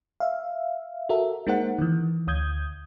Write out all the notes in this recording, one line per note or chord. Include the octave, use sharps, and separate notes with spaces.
E5 F5
F#4 A4 A#4 E5
G#3 A#3 D#4 A#4 C5 F#5
D#3 E3
D2 D#6 G6 G#6